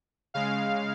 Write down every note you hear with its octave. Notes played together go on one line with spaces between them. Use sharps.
C#3 G#3 F5